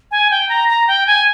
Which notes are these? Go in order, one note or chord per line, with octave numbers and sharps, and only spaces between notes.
G#5
G5
A#5
A#5
G5
G#5